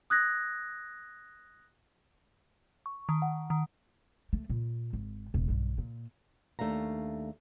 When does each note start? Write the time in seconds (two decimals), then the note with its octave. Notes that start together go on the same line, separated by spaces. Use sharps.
0.10 D#6 F#6 G#6 A#6
2.86 C#6
3.09 D#3
3.22 F#5
3.50 D#3
4.33 A3
4.49 A#2
4.93 G#1
5.34 E1
5.48 B1 G2
5.78 A#2
6.59 D#2 A3 D4 F5 A#5